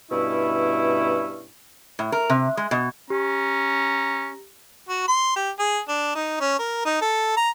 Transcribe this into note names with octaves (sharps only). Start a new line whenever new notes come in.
G2 B2 C#4 E4
A2
A#4
C3
G#3
B2
C#4 G4 A#5
F#4
C6
G4
G#4
D4
D#4
C#4
A#4
D#4
A4
A#5